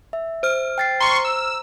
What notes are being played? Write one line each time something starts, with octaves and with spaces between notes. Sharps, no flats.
E5
C5 F6
G5 A6 C7
A#5 C6 C#6
E6